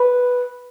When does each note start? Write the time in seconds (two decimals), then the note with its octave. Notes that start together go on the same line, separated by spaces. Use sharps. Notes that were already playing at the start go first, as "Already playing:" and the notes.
Already playing: B4